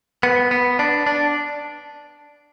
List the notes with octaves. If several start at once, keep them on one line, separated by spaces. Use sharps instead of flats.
B3
B3
D4
D4